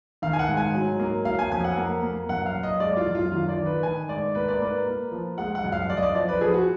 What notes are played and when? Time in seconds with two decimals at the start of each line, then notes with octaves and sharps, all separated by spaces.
0.22 D#3 F5
0.33 G#5
0.39 F#5
0.48 G#2
0.57 G#5
0.74 F#3
1.00 A#3
1.25 F#3 F5
1.39 G#5
1.51 F2 G#5
1.64 F#5
1.77 A#3
2.03 A#3
2.29 F#2 F#5
2.46 F5
2.54 F#2
2.63 D#5
2.80 G#3 D5
2.97 F4
3.06 F#2
3.15 F4
3.32 D#3 F4
3.49 D5
3.58 D#3
3.66 B4
3.83 D#3 G#5
4.09 G#2 D5
4.35 A#3 B4
4.48 D5
4.61 A#3 B4
4.87 A#3
5.12 F3
5.38 G#3 F#5
5.55 F#5
5.64 F#2
5.72 F5
5.90 F#2 D5
5.97 D#5
6.03 D5
6.15 F3 D5
6.29 B4
6.41 F3 G#4
6.54 F#4